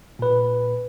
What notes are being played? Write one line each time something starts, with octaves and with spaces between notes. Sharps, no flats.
A#2 B4